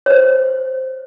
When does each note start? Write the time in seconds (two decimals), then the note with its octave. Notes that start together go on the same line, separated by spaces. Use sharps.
0.06 C5 C#5